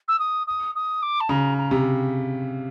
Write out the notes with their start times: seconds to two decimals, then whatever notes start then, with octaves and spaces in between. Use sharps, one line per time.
0.08 E6
0.19 D#6
0.47 D#6
0.75 D#6
1.02 D6
1.20 A5
1.29 C#3 A#5
1.58 A#5
1.71 C3